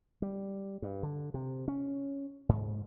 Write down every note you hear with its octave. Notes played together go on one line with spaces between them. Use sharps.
G3
G2
D3
C3
C#4
G#2